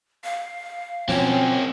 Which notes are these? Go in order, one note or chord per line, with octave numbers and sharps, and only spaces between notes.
F5
B2 F3 A#3 C4 C#4 C#5